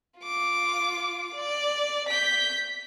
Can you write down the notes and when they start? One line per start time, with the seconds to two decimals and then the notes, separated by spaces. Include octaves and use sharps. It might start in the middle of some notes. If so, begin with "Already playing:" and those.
0.20 F4 D6
1.35 D5
2.09 G6 B6